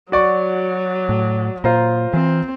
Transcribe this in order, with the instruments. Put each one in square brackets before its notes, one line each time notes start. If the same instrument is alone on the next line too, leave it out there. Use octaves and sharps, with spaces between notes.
[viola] F#3 [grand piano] F#4 D5 C#6
[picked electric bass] A2
[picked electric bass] A#2 [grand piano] F4 C5 A#5
[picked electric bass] E3 [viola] C4